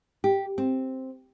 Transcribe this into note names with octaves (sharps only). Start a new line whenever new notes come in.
G4
C4